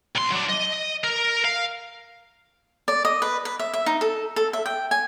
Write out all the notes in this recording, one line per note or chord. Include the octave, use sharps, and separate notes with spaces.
C2 C6
F#3 D4
D#5
A#4
F5
D5
D#5
B4
B4
E5
E5
D#4
A4
A4
E5
G5
G#5